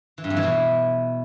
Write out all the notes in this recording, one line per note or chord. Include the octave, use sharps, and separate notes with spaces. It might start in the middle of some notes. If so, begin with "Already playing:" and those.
E3
G2
F2
E3
B2